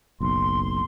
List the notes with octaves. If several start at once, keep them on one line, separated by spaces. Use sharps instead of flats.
F#1 B1 C6